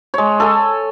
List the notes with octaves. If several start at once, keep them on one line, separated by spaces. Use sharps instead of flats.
G#3 C#5
A4 G#5